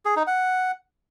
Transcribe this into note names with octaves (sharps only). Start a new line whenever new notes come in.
G#4
D#4
F#5